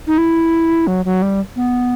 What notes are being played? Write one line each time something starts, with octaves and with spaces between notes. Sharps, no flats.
D#4
E4
F#3
F#3
G3
B3